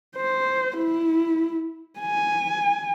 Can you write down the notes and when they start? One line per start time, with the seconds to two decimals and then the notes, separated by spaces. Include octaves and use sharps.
0.17 C5
0.77 E4
2.00 G#5